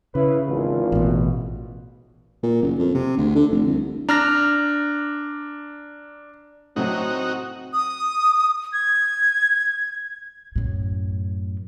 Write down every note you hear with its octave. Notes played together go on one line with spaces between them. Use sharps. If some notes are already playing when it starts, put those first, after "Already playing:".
C#3 E4 B4
G#1 E2 F4
A1 B2
A#2
F#1
F2
C3
D2
D3
F1
C2
D4 A#5 F6 A#6
A2 C3 F#3 C4 D#4 F#4
D#6
G#6
F#2 A2